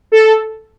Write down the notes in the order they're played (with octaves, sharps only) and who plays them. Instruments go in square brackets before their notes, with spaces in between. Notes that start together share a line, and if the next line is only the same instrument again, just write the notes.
[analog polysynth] A4